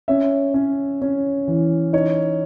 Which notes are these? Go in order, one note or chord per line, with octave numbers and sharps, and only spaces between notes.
C#4 E5
C#4
C#4
E3
D#4 C#5